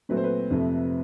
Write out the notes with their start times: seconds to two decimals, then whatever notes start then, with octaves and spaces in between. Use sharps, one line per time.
0.09 A#2 F#3 A3 C4 B4
0.17 C5
0.24 B4
0.51 F2 C3 F3 A3